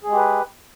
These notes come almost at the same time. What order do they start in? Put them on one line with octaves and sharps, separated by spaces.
G#4 G#3 G4 B4